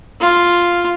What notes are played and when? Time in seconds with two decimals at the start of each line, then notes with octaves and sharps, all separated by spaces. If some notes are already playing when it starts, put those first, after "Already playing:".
0.20 F4